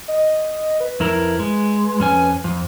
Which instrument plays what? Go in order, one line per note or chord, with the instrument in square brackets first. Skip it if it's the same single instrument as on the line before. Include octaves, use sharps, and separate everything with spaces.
[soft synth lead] D#5
B4
[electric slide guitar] F2 E4 A#4
G#3
F2 C#4 G#5
F2